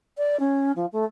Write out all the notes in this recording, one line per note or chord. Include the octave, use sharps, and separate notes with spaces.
D5
C#4
F3
A3